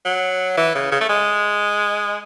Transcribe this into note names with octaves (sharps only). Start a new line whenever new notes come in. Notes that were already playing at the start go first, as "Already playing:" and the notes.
F#3
E3
C#3
C#3
A3
G#3